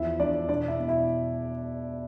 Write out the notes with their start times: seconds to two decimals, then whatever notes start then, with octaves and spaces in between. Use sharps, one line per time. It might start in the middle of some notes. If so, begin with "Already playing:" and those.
Already playing: E2 F3 E4 E5
0.20 E2 D4 D5
0.49 B2 D4 D5
0.68 E4 E5
0.79 B2
0.88 E4 E5